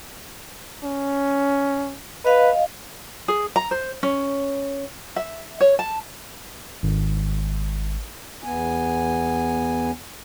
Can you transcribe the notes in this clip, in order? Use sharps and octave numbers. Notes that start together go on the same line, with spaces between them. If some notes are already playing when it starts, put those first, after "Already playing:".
C#4
B4 D#5 F5
G#4
A#5
C5
C#4
E5
C#5
A5
G#1
E2 B3 G#5